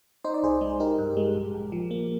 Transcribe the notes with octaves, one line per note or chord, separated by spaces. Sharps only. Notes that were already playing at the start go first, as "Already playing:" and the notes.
D#4 C5
D5
C2 G#4 C5
G#3
D#4 G4 A#4
G2
G#3
A#1
A#1
F3
A#3